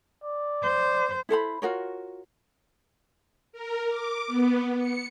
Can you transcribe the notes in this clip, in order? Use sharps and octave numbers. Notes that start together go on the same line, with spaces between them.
D5
C5
E4 A4 C5 B5
F4 F#4 A#4 C#5
A#4
D6
B3
C#7